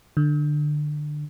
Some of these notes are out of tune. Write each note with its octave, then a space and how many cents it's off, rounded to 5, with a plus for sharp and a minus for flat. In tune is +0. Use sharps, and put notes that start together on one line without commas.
D3 +20